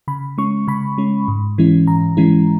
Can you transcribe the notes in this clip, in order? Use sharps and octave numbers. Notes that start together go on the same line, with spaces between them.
C#3 B5
G#3 C#4 C#6
C#3 B5
G#3 C#4
G#2
E3 G#3 C#4 E4
G#2 A#5
E3 G#3 C#4 E4